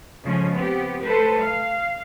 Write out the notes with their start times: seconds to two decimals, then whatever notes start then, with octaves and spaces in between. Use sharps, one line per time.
0.24 C#3 F3 G#3 A3 C#4
0.54 B3 C4 G4
1.03 A3 A4 B4 C5
1.40 F5